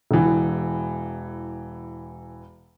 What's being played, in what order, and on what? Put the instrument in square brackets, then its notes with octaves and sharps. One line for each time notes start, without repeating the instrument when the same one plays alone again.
[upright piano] E1 E3